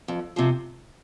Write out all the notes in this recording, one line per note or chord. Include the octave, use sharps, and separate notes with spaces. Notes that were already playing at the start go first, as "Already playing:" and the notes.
F2
C3 F3